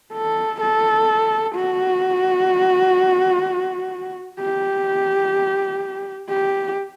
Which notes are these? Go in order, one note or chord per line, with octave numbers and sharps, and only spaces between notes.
A4
A4
F#4
G4
G4